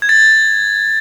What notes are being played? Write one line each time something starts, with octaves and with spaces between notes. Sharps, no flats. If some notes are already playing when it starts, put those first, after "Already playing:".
G#6
A6